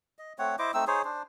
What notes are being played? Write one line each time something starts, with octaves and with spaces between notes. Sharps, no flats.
D#5
A3 C4 C#5 F#5
E4 C5 D#5 D6
A3 C4 D#4 E6
D#4 G#4 C5 C#5
D4 C5